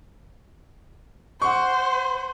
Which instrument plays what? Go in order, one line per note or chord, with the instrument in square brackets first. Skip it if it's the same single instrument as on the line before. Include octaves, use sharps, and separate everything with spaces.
[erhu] C5 [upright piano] F#5 C#6